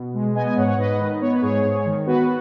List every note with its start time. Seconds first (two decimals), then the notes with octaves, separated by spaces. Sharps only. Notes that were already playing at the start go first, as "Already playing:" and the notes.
Already playing: B2
0.14 G#3
0.35 B3 D#5 G#5
0.46 D#5 G#5
0.57 G#2 C#5 F#5
0.67 C#5 F#5
0.78 G#2 B4 D#5
0.99 D#3
1.21 B3 C#5
1.32 B4
1.41 G#2 G#4 C#5
1.64 G#2
1.85 D#3
2.06 B3 F#4 B4